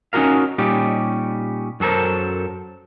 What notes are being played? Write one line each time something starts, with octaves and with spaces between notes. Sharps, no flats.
C#4 D#4 E4 F#4 A#4 F5
A#2 G3 C#4 D#4 G4
F#2 F#3 A4 A#4 C5